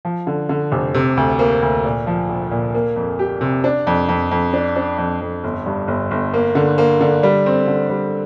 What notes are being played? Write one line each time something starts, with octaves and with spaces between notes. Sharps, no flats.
F3
D3
D3
F1
C3
D2
A#3
D2
A#2
F3
A#1
A#2
A#3
F2
G4
C3
D4
F2
F2
F2
D4
D4
F2
F2
G1
G2
G1
G1
A#3
D3
A#3
D3
G3
C4
D3
G3